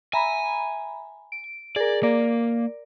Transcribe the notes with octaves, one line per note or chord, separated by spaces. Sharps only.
E5 G#5 A#5 B5
D7
G#4 A#4 D5
A#3 A#4 D5